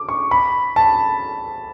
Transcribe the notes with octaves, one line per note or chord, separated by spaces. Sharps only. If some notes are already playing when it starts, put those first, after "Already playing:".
Already playing: D6
C#6
B5
A5